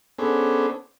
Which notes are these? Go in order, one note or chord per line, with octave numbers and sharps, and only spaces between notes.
B3 C#4 D4 G#4 A4 C5